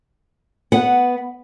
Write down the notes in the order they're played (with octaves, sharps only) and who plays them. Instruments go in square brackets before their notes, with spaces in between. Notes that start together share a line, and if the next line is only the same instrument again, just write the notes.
[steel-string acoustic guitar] B3 [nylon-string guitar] F#5